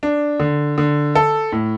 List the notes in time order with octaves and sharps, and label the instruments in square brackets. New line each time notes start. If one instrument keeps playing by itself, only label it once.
[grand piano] D4
D3
D3
A4
A2